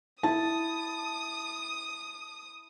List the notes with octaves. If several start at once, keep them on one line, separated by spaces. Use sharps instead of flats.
E4 A5 D#6